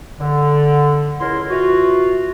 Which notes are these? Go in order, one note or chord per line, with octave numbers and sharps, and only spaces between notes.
D3
C#2 E4 A#4 C6
E3 F4 F#4